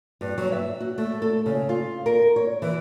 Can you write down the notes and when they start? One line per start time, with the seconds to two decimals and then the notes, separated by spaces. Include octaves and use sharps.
0.21 G2
0.38 F#3
0.52 E5
0.80 F#4
0.98 A3
1.22 A4
1.46 C#3
1.69 F4
2.06 A#4
2.36 C#5
2.62 E3